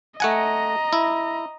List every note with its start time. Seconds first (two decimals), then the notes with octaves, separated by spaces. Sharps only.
0.20 A3 D#5 F#5 G#5 A#5
0.93 E4